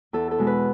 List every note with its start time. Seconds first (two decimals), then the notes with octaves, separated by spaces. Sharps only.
0.13 E2 A4
0.31 A4
0.38 B2 G#3
0.47 B4